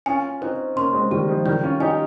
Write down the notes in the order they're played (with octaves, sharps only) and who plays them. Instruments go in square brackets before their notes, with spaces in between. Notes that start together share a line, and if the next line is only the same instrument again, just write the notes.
[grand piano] C#4 F4 [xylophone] G#5
[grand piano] C4 D#4 [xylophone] C5
[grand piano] A#3 C#4 [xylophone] C6
[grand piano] G#3 C4
[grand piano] D#3 G3 [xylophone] G4
[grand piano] F3 G#3
[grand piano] D#3 G3 [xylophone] G6
[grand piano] C#4 F4
[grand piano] D#4 G4 [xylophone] G#5